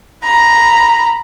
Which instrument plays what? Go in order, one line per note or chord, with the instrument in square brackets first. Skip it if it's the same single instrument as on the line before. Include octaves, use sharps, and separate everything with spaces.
[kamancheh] A#5 B5